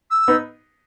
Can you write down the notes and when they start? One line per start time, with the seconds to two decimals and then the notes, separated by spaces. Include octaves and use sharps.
0.10 E6
0.28 B3 D#4